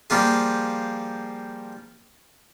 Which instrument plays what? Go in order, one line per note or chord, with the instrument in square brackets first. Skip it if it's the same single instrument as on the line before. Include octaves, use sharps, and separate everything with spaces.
[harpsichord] F3 G3 A#3 F4 G#4